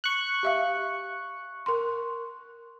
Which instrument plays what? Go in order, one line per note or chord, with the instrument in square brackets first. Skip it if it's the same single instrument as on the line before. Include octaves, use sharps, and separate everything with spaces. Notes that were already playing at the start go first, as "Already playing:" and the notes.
[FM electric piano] C#6 F#6
[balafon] G4 E5 F5
A#4 C6